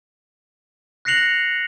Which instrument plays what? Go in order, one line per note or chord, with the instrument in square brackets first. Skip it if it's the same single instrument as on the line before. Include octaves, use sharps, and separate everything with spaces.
[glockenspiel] F#6 A#6 C7 C#7 F7 F#7